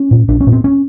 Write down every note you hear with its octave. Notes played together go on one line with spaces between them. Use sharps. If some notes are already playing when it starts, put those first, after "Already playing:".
Already playing: C#4
A#2
A#1 D4
C#4
A#2
C4
C#4